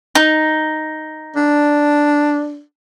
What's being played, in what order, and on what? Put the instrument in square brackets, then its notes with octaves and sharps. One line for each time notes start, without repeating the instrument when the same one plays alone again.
[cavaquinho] D#4
[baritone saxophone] D4